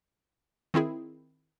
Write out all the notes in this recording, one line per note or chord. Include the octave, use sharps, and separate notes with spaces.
D#3 C4 E4 G#4